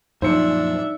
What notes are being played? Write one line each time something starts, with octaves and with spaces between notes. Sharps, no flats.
F#2 A#2 F3 D4 D#4 C5 E5 C#7